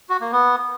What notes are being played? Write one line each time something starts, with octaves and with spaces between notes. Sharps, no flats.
F#4
A#3
B3